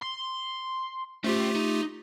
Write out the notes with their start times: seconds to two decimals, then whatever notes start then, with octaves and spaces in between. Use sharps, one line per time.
0.02 C6
1.24 A3 C#4 F4 G4 C5
1.55 D#4